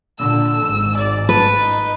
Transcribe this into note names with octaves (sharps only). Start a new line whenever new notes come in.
A#2 D3 E6
G#1 G#2
D5
B4 A5
D#4